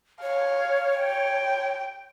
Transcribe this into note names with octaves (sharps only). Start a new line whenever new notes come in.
C#5 F5
G5